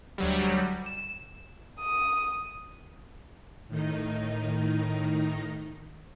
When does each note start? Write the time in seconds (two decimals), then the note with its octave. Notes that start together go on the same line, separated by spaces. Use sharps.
0.18 D2 F#3 G3
0.86 E7
1.80 D#6
3.68 A2 D#3 D#4